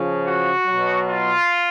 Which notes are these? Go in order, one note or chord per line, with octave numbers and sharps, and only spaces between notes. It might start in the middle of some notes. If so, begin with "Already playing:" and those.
Already playing: C#3 F3
F#4
B2 F#3
F4